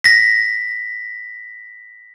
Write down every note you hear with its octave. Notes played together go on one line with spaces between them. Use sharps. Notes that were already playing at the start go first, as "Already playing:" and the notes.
A#6 B6